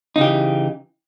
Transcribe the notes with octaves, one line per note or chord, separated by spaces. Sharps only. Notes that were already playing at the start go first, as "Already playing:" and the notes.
C#3 E3 D#4 G4